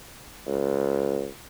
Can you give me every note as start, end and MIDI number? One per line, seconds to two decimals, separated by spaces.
0.47 1.27 37